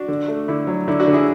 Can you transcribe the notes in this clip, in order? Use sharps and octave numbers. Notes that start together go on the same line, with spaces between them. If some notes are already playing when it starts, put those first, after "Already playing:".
Already playing: D4 F#4
D3
A3
D3 E4
F#3
D3 E4
D4 F#4
D3
E4 G#4